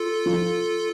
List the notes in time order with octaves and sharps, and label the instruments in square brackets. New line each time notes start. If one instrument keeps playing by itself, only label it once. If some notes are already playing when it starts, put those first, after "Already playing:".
Already playing: [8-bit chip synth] F4 A4
[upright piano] F3